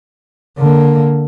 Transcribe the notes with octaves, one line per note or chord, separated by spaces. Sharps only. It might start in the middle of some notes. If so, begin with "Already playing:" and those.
D3 A#3